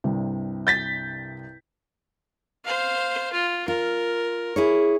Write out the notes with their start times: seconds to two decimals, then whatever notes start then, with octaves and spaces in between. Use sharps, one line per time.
0.04 C2 G2 C3
0.67 G6 A6 B6
2.64 C5 F5
3.32 F4
3.68 F4 A#4
4.56 E4 G#4 C#5